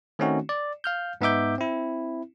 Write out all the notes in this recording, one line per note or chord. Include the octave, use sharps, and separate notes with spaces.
D#3 A3 C4 C#4 D#4 F#4
D5
F5 F6 G6
G#2 B3 D#4 E5 D6 G6
C4 E4